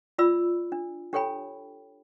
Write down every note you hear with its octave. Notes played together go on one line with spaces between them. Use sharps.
F4 D5 B5 E6
D4
D4 G4 A4 C#5 G5 B5